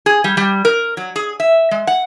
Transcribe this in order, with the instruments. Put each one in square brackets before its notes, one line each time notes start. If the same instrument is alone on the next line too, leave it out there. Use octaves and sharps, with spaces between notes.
[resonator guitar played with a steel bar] G#4
G3
G3
A#4
F#3
G#4
E5
G#3
F#5